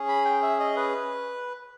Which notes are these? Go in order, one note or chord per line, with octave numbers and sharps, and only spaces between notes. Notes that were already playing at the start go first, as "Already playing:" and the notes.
Already playing: C#4 G#4
B5
G5
E5
D#5
B4